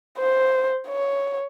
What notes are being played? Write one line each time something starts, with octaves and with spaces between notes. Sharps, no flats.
C5
C#5